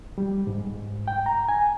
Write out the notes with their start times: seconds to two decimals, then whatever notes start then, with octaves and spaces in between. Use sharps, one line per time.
0.18 G3
0.47 G#2
1.08 G5
1.26 A#5
1.49 G#5